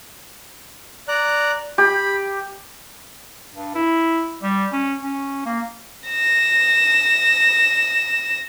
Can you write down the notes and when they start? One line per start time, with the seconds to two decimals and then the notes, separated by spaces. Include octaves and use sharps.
1.08 D5 A#5 F#6
1.78 G4 B5
3.55 G2
3.75 E4
4.43 G3
4.72 C#4
5.02 C#4
5.46 A#3
6.09 A#6 E7